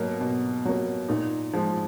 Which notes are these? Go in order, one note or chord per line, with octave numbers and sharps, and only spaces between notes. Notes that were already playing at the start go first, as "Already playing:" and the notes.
Already playing: B2 F#3 A#3
B2
F#3 A#3
A#2 D#4
F3 G#3